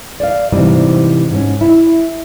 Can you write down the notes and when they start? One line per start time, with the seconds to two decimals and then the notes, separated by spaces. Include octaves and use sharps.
0.20 D5 F5
0.52 G#2 C3 E3 G3 C4 D#4
1.31 G#2 C#4
1.61 E4